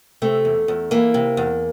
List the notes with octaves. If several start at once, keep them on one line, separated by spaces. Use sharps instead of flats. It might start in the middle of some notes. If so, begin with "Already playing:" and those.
C3 A3
E2
E2
E3 A#3
C3
E2